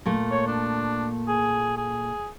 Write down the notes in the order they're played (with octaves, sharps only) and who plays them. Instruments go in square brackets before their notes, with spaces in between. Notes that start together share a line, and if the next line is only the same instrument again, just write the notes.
[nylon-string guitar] A#2 A3 A#3
[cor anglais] C#5
D4
G#4
G#4